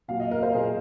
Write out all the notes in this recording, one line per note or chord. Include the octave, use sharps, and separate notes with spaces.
A#2 F#3 F5
D#5
A#4
C5
A#2 F#3 G#4